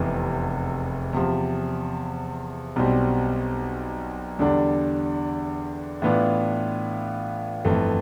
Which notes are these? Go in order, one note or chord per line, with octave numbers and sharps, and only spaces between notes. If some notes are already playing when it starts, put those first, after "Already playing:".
Already playing: F1 E2 C3 E3
E2 C3 F3
B1 B2 G3 C4
E2 D3 G3 D4
A2 E3 B3 D4 F4
G1 F2 E3 A3